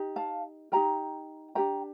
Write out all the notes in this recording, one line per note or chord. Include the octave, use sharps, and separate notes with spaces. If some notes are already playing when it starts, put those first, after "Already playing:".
Already playing: D#4 G4
F5 A5
D#4 G4 A#4 G5 A#5
D4 G4 A#4 G5 A#5